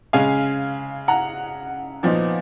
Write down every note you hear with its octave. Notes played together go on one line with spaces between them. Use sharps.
C#3 G#3 C#4 F5 G#5
F#5 A#5
A#2 F3 B3 D#4